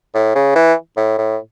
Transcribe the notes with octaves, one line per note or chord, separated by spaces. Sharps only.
A2
C#3
E3
A2
A2